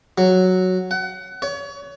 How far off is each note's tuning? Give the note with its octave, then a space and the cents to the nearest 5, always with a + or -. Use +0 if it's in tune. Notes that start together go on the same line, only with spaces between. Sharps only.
F#3 +0
F#5 +25
C#5 +35